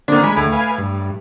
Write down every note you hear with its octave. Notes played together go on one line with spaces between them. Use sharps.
D3 D#3 A#3 C4 D4
G#3 G#5 B5
D2 A2
B4 F5 G#5
G2